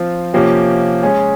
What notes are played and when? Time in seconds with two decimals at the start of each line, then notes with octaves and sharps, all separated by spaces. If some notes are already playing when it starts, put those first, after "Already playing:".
Already playing: F3 C4 F4
0.34 C3 F3 A#3 C#4 G4
1.03 G#3 C#4 G#4